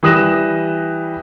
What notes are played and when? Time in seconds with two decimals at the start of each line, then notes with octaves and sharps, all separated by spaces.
0.03 E3 G3 D#6 F#6 A#6 E7